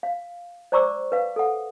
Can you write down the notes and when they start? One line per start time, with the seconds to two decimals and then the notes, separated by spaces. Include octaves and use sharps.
0.03 F5
0.72 C5 D5 A#5 C#6 D6 E6
1.12 B4 F5
1.36 A4 F#5